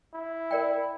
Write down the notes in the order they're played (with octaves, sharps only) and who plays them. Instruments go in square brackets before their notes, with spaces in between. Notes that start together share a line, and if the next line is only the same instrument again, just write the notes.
[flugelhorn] E4
[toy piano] A#4 D5 G5